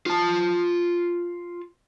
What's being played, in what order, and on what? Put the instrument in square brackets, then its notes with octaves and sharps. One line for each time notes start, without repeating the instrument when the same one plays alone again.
[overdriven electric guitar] F4 A5